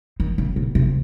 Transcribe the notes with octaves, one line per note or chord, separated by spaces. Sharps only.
D#3
C#3
A#2
C3